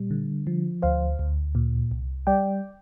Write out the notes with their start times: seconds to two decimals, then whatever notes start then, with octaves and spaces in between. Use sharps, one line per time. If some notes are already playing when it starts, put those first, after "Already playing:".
Already playing: A#2 G3
0.11 D3
0.47 F3
0.82 D2 C5 F5
1.19 D2
1.55 A#2
1.91 C2
2.27 G3 D5 G5